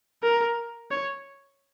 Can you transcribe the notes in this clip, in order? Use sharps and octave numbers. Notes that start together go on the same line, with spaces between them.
A#4
C#5